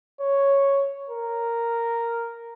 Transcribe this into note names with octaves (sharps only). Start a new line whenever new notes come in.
C#5
A#4